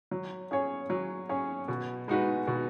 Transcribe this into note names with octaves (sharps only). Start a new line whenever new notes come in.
F#3
C#4 G#4 C#5
F#3
C#4 G#4 C#5
B2
G#3 D#4 F#4 B4
B2